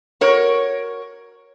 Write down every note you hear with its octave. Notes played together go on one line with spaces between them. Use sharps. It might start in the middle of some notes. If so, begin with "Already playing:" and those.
F#4 A#4 C#5